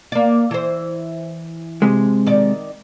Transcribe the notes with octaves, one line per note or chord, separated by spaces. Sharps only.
A#3 D5
E3 C5
C3 G#3
D#3 D5